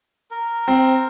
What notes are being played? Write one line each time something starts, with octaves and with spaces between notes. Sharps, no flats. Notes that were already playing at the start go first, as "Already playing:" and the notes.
A#4
C4